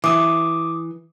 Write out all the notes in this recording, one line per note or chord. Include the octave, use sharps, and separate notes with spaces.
E3 D6 D#6